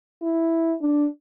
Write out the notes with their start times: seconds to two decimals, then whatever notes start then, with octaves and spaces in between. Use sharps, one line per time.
0.22 E4
0.82 D4